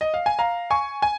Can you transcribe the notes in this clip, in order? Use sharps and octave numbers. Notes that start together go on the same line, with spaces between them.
D#5
F5
G#5
F5 A#5
G#5 C#6
G#5